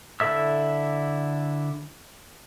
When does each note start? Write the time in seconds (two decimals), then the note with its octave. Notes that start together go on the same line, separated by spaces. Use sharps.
0.20 D3 E4 A4 E5 E6